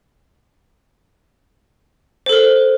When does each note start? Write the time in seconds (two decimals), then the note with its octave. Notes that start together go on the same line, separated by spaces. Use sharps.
2.26 C5
2.29 A4
2.32 A#4